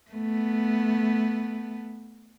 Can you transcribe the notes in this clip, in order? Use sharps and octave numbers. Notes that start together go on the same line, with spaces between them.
A3 B3